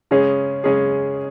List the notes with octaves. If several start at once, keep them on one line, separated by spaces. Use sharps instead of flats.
C#3 G#3 C#4 G#4
C#3 G#3 C#4 G#4